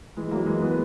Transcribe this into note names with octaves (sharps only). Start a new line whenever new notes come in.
E3 G#3
F#3 A#3
E3 G#3
G#3 B3